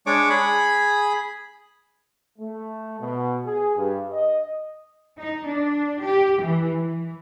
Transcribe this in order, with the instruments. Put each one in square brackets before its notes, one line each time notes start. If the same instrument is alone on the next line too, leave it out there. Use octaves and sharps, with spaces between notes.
[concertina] G#3 D4 C#5 D6
G#4 B5
[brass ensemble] A3
B2
G#4
G2
D#5
[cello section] D#4
D4
G4
E3
E3